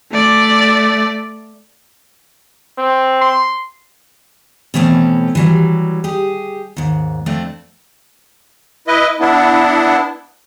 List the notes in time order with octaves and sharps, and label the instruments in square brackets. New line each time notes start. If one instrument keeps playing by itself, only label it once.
[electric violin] A3 D5
[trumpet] C4
[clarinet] C6
[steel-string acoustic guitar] B2 E3 A3 C4 C#4
E3 F#3 G3
G4 G#4
D#2 G#2
F2 A3 C4 D4
[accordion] E4 B4 D#5
B3 D4 E4